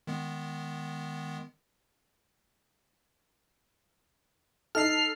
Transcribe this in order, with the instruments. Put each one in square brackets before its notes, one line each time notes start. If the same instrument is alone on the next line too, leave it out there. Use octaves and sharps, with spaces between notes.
[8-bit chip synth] D#3 G#3 B3
[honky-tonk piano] D#4 A4 [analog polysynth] F6 C7